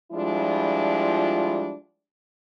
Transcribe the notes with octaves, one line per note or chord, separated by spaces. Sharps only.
F3 G3 G#3 D4 E4 F4